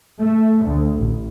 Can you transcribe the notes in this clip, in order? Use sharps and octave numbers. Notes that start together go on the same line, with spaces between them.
A3
D2
A1